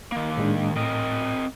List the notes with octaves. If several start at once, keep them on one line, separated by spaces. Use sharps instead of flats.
D#3 A#3
A2 G#3 D4
A2 C4 A#4 D#5